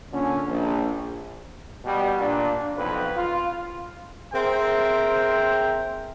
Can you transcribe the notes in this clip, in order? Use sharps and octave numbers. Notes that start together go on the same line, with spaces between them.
A#2 D3 C#4
A#1
B2 G3
A#2 D4
B1 F2 B4
F4
C4 G#4 A#4 C5 E5 G5